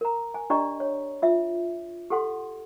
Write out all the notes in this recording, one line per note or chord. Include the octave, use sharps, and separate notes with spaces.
A#4 A#5
G#5
D4 G4 D5 D#5 A#5 C#6
C#5
F4 E5
G4 A4 F#5 C6